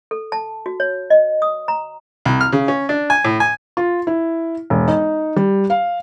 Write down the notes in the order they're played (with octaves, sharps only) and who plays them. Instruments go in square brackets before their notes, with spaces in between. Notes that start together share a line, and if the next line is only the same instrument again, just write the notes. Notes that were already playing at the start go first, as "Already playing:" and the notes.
[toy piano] A4
A5
F#4
C#5
D#5
D#6
A#5
[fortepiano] C2
F6
C#3
C#4
D4
G#5
A2
G#5
[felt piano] F4
E4
E1
D#4
G3
F5